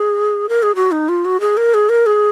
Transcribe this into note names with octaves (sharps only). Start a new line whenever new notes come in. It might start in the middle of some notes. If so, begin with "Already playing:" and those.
Already playing: G#4
A#4
G#4
F#4
D#4
F4
F#4
G#4
A#4
G#4
A#4
G#4